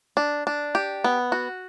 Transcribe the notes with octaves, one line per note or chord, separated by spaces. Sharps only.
D4
D4
G4
B3
F#4